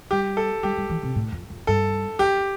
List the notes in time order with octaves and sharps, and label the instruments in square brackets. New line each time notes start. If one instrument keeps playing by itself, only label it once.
[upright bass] G3 [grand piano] G4
[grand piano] A4
[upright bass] G3 [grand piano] G4
[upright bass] G3
E3
C3
A2
F2
F2
[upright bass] G2 [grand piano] A4
[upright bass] F2 [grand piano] G4